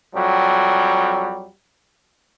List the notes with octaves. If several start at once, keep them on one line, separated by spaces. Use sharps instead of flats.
F2 F#3 G3